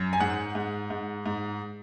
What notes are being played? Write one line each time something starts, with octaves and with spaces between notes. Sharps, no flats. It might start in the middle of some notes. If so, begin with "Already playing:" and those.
Already playing: F#2
G#5
G#2 F#5
G#2
G#2
G#2